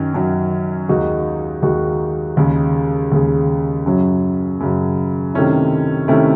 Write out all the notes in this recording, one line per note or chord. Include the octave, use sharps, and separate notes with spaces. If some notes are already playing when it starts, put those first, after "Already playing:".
Already playing: F#2 D#3 F#3 C#4
F#2 D#3 F#3 C#4
D#2 D#3 G#3 D#4 F#4
D#2 D#3 G#3 D#4 F#4
D#2 C#3 G#3
D#2 C#3 G#3
F#2 C#3 F#3
F#2 C#3 F#3
C3 D#3 A3 C#4 E4
C3 D#3 A3 C#4 E4